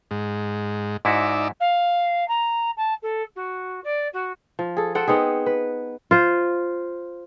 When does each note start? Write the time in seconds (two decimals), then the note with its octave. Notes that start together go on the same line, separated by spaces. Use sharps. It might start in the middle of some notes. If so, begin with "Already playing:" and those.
0.11 G#2
1.05 G#2 D#4 E4 F#4 D5 E5
1.60 F5
2.28 A#5
2.77 A5
3.02 A4
3.35 F#4
3.83 D5
4.13 F#4
4.59 F3
4.76 G#4 A4
4.95 A4 C5 F#5 G5
5.07 B3 C4 D#4 G#4
5.46 B4
6.11 F4 C5